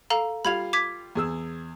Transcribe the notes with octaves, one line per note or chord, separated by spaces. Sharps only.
A4 F5 A#5
G3 F4 F5 B5 G#6 F7
D6 G#6 B6
E2 G#4 E6